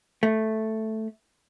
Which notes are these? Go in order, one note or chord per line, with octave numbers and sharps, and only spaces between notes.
A3